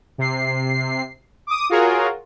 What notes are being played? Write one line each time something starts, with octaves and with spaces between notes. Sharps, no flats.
C3 C7
D6 D#6
F4 F#4 G#4 A#4 C#5